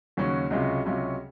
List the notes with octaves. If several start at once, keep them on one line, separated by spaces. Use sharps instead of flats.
D#2 C#3 F#3 C#4 F#4
C#2 C3 F#3 C#4 F4
C#2 C3 F#3 C#4 F4